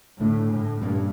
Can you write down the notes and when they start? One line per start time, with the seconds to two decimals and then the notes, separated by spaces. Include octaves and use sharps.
0.19 A2 D3 A3 D4
0.49 A2
0.81 G2 A#2 G3 A#3 C#4